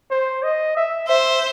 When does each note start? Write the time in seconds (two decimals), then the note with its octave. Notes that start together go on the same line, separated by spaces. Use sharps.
0.11 C5
0.43 D#5
0.76 E5
1.08 C5 E5